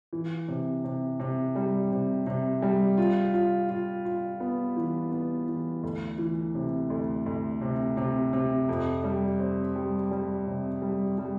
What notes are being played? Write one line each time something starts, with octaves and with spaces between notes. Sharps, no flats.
E3
C3
C3
C3
G3
C3
C3
G3
F4
F4
F4
F4
B3
E3
B3
E3
D2
E3
C3
D2
D2
C3
C3
C3
F2
G3
C4
G3
G3
C3
G3
G3